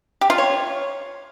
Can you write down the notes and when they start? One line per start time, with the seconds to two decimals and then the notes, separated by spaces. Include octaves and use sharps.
0.21 G4
0.30 F4
0.38 C#5